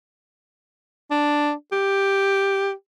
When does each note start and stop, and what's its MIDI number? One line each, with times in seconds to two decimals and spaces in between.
1.11 1.51 62
1.72 2.71 67